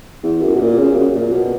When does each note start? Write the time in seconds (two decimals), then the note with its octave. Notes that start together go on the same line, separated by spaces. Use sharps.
0.24 E2
0.42 F#2
0.55 B2
0.60 A#2
0.79 C#3
0.96 F#2
1.15 A#2
1.33 B2